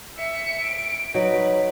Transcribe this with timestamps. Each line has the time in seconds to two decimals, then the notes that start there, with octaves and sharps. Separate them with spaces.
0.17 E5 C#7
0.62 D7
1.14 F#3 D#4 B4